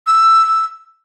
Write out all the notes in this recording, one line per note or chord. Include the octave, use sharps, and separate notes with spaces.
E6